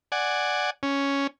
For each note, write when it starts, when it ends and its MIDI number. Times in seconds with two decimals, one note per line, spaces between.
0.12 0.70 74
0.12 0.70 78
0.12 0.70 80
0.83 1.27 61